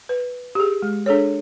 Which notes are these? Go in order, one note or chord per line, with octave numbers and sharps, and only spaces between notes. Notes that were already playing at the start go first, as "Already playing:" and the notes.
B4
G4 G#4
G#3
D4 G#4 A4 C#5